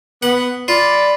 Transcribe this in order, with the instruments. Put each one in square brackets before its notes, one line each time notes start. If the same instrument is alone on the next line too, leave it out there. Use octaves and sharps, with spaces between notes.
[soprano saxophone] B3 [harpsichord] F#5
[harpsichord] F4 [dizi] D5 [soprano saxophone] B5